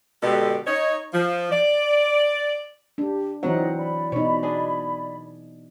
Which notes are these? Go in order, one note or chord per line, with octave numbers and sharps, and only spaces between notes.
B2 D3 G#3 G4 A4
D#4 C#5
F3
D5
D4 G4
E3 F#3 C4 D#4 D5 F#5 A#5
D5 B5
B2 D#4 C#5
D4 G#4